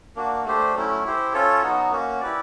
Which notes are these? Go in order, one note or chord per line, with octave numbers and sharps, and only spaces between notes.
A#3 D4 F#4
A3 D4 G4 C5
F#3 A3 C#4 E4
E4 G4 C5
C#4 F4 A4 C#5
F#3 B3 D#4 F#4
A#3 C#4 F#4
E4 G4 B4 D5